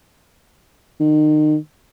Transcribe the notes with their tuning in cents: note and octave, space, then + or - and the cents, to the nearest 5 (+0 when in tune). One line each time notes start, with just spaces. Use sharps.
D#3 -30